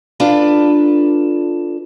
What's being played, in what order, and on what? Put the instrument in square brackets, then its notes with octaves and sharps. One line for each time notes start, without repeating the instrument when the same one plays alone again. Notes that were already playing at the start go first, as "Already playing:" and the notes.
[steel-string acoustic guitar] D4 F4 A4 B4